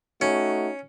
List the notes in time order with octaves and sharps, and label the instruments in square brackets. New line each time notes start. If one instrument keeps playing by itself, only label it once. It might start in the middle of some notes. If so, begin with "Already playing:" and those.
[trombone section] A3 D#4 F#4 [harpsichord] C#4